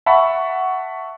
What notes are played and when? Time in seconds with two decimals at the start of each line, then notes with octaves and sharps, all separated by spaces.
0.06 E5 F#5 A5 B5 C#6